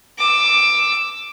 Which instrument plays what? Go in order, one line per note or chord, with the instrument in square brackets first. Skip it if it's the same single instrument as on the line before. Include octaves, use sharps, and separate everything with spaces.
[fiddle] D6 E6